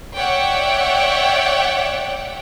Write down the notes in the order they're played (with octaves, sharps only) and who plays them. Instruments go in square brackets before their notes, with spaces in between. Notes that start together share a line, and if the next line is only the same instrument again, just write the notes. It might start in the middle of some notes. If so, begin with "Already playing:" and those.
[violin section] C#5 D5 E5 F#5 G5